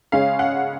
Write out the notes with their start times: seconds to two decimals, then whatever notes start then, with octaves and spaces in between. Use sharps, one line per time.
0.12 C#3 G#3 C#4 F5
0.39 F#5